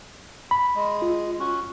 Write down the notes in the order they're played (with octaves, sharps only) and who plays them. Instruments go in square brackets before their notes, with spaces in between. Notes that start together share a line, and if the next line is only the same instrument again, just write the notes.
[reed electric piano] B5
[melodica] G#3
[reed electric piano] F4
[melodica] C#4 F#4